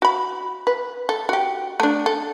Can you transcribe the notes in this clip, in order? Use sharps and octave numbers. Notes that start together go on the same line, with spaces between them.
F#4 B5
B4
A4
F#4 G4
A3 D4
A4